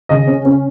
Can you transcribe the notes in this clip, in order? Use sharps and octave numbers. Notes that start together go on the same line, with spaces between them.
C#3 D#5
C#4
C#4